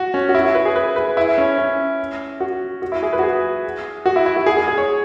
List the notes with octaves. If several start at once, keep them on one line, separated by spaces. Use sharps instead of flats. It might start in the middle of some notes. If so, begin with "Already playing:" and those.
Already playing: F#4
C#4
F#4
E4
F#4
B4
G#4
B4
B4
E4
C#4
C#4
F#4
F#4
E4
G#4
B4
F#4
G#4
F#4
E4
E4
F#4
G#4
G#4
G#4
C#5